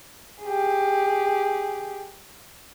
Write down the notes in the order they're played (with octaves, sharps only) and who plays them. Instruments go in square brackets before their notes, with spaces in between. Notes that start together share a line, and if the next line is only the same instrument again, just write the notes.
[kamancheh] G4 G#4